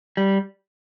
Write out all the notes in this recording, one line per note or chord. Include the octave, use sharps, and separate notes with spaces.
G3